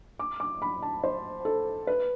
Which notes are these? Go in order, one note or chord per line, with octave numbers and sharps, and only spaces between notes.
D6
D6
B5
A5
C5
A4
B4